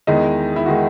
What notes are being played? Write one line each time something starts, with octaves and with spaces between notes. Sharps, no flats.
E2 D#3 G#3 D#4
E4
D#3 G#3 F#4